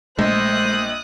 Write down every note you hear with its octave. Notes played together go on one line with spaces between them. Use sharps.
A#1 G#3 A3 C5 D#5 D#6 F#6